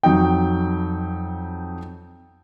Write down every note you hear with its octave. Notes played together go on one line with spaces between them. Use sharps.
F2 F#3 D#4 G5